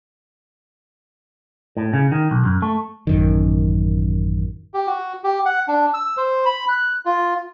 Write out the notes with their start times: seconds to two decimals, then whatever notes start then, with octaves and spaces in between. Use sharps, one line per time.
1.77 A2
1.94 C#3
2.12 D#3
2.31 B1
2.45 F#2
2.62 A3
3.07 A1 F#2 D#3
4.74 G4
4.87 F#4
5.24 G4
5.45 F#5
5.68 D4
5.94 E6
6.17 C5
6.45 B5
6.69 F#6
7.05 F4